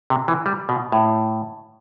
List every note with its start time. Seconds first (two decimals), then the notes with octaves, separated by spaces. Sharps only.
0.10 C3
0.28 E3
0.46 G3
0.69 B2
0.92 A2